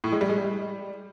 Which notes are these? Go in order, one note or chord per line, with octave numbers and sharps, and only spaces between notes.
A2
G#3
G3
G#3
G3